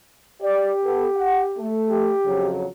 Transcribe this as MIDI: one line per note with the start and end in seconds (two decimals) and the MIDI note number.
0.42 1.73 67
0.42 0.69 74
0.84 1.07 59
0.84 1.07 69
1.16 1.43 78
1.58 2.11 57
1.90 2.51 67
2.26 2.66 41
2.26 2.66 49
2.26 2.66 54